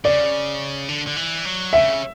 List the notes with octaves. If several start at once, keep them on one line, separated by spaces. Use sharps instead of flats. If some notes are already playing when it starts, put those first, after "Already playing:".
C#3 D5
D3
D3
E3
F#3
C#3 E5